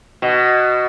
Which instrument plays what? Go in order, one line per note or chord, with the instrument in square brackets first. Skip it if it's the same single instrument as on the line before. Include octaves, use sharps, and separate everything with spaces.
[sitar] B2